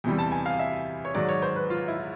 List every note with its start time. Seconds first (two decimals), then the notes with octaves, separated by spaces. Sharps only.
0.04 E2 C3 E3 G3
0.19 A5
0.32 G#5
0.46 F5
0.59 E5
1.05 C#5
1.15 G#2 D#3 F#3 D5
1.29 C#5
1.42 C5
1.56 B4
1.70 F4
1.88 E4